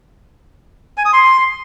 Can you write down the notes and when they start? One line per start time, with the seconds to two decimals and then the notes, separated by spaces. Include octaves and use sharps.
0.98 G#5
1.05 D#6
1.13 C6